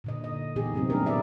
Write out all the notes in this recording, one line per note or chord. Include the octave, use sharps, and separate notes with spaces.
A#2 D3 D#5
D#5
A#2 E3 B3 D#4 G4 G#4
C3 F#3 A3 C4
G3 B3 C4 D4 G4 A#4
A#2 E4 A#4 D5 E5